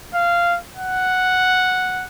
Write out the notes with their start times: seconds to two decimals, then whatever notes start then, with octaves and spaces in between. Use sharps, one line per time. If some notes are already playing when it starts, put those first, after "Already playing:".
0.14 F5
0.77 F#5